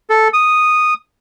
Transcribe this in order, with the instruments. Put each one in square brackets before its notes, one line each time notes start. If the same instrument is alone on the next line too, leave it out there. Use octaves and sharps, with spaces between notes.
[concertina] A4
D#6